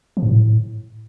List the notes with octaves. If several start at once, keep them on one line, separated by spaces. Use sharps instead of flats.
F3
G#2
A2